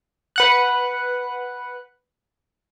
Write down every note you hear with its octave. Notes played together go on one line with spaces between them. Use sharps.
B4 F#5 F#6